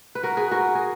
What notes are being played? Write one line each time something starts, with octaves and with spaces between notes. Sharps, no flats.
B4
F#4 A#4
G#4 B4
F#4 A#4
G#4